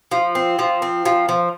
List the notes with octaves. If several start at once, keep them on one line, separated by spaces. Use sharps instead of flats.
F3
C4
F3
C4
F3
F3